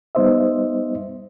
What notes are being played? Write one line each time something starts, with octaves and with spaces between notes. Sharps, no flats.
G3 B3 D#4 C5 D#5 E5